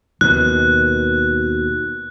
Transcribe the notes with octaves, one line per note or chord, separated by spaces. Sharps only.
D#2 B2 F#6